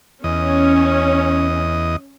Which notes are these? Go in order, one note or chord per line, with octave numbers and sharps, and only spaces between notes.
E2 C#4 D#5